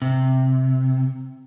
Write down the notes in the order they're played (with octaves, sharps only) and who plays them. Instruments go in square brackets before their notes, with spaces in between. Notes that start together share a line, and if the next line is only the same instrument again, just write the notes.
[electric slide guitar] C3